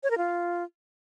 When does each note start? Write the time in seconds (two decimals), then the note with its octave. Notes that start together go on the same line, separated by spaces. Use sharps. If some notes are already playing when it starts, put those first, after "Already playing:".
0.03 C#5
0.11 A#4
0.18 F4